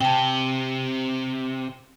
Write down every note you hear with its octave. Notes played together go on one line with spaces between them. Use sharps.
C3 G5 A5